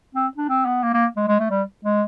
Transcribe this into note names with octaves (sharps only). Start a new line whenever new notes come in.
C4
D4
C4
B3
A#3
A#3
G#3
G#3
A3
G3
G#3